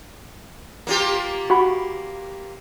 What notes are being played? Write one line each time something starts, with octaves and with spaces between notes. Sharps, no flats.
A#3 F4 G4
F#4 F#5 B5